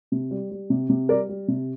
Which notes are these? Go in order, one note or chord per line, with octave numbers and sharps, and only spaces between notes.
C3
G3
G3
C3
C3
G3 A#4 D5
G3
C3